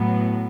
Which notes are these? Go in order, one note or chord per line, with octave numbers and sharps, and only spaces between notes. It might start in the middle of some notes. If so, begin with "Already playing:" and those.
Already playing: A2 F#3 B3